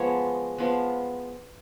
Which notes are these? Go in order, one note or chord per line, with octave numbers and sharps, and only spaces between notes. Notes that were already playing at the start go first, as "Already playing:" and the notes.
Already playing: F3 G#3 B3 C#5
F3 G#3 B3